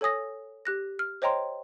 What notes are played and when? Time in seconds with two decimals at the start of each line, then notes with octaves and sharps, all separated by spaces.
0.01 A4 C#5 G#5 D#6 A#6
0.65 G4 F#6 A#6
0.99 F6
1.22 C5 C#5 D#5 G5 A#5 C6